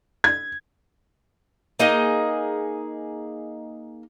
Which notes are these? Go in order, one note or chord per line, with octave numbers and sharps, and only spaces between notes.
G#6
A#3 D#4 G#4 D#5